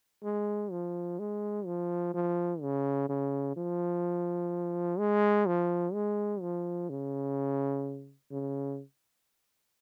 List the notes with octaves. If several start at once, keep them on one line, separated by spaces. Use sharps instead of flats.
G#3
F3
G#3
F3
F3
C#3
C#3
F3
G#3
F3
G#3
F3
C#3
C#3